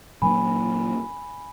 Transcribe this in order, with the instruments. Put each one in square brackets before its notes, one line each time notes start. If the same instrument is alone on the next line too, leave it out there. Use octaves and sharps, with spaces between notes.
[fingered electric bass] A#2 F#3 A#3 C#4 [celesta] G#5 B5